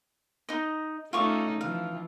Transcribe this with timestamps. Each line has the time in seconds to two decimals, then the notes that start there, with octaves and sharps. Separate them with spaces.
0.49 D#4 D#5
1.13 A3 C#4 D#4 F4 C#6 D6
1.61 E3 F3 F5